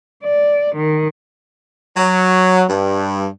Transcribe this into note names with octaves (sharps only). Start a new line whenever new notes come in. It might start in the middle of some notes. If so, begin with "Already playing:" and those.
D5
D#3
F#3
G2